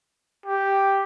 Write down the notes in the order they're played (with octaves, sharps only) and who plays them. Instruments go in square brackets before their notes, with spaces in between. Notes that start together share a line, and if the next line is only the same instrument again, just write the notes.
[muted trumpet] G4